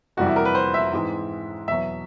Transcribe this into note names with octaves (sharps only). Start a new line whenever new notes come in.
G1 F2 C3 E3 G3 F#4
E4
A#4
B4
C5
E5
G#2 E3 G#3 C4
E2 B2 F#3 E5